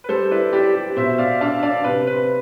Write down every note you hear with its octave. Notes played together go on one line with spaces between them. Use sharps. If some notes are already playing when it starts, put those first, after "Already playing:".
B4
G3 A4 C5
E4 B4 D5
G4 B4 D5
G4
B2 C5 E5
B2 D5 F5
D4 F5 A5
D4 D5 F5
C3 B4
C4 B4